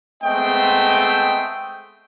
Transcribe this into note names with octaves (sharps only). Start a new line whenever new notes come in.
G#3 A3 B3 C4 D#5 G5